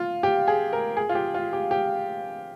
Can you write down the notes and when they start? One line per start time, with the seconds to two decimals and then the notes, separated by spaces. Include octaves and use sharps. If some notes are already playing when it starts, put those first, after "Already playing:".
Already playing: F4
0.23 G4
0.48 G#4
0.73 A#4
0.97 G#4
1.09 F4
1.15 G4
1.34 F4
1.53 G4
1.71 G4